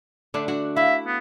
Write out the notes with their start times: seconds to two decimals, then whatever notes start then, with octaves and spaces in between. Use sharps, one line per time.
0.34 D3 A3 D4
0.48 D4 F#4 F#5
0.76 E4 E5 F5
1.07 B3